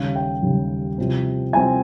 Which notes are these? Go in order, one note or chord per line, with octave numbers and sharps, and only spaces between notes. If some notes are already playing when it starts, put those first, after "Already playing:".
Already playing: D#2 C#3 G3 C#4 F5
G5
D#2 C#3 G3 C#4
C2 C3 F3 C4
C2 C3 F3 C4 G#5